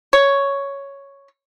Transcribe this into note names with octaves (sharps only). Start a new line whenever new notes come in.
C#5